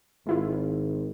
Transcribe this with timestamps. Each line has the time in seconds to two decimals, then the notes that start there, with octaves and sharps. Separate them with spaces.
0.27 G#1 G#3 E4 F4